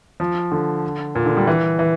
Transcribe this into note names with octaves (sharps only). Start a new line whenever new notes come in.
F3
D3
A#2
D3
G3
E3
E3